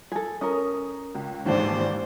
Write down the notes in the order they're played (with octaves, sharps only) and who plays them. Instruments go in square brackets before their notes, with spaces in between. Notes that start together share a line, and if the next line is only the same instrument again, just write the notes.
[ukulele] G#4 A4
[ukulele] C#4 A#4 [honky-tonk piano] D#6
[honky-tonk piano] C#2
[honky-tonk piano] D#2 E3 D4 [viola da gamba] G#2 C5